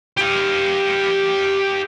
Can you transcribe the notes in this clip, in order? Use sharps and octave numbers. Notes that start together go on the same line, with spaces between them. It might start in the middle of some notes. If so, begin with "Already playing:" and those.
G4 F5